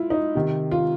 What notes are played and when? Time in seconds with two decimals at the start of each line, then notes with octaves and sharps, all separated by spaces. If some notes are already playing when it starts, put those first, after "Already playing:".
Already playing: E4 F4
0.10 D#4
0.35 C3 D#3
0.71 F4